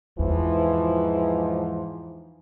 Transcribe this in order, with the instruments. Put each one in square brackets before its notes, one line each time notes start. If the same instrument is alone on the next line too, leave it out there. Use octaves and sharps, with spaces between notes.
[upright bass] E2 [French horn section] G#2 F3 [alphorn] E3